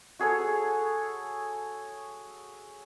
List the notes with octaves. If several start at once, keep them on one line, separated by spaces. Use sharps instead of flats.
F#4 G#4 A4 C#5